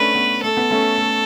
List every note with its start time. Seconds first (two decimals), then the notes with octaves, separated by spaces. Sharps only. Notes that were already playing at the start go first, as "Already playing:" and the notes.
Already playing: A3 C#4 D4 B4
0.15 B3
0.42 A3 A4
0.57 B3
0.70 A3 C#4
0.98 A3